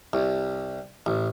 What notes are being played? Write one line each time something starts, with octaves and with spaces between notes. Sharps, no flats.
C2
A1